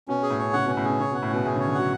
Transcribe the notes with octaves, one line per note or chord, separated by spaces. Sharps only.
B2 C#4
G#4
A2
C#5
C#3 F#5
B2 C#4
A2
B2 G#4
C#3 C#5
B2 F#5
A2
B2 C#4
A2 G#4
C#3 C#5
D3
F#3 F#5